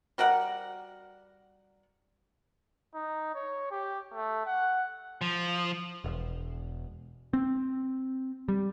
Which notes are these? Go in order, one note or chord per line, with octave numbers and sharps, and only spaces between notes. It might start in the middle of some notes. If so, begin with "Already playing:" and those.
G3 F#4 A#4 F#5
D#4
C#5
G4
A3
F#5
F3
E1
C4
G3